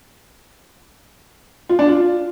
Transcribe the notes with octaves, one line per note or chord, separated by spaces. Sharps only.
F4
D4
F4